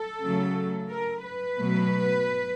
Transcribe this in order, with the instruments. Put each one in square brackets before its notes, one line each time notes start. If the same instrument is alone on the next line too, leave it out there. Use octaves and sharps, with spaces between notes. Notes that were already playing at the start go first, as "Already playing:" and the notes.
Already playing: [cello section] A4
C#3 F#3 A3
A#4
B4
B2 F#3 A3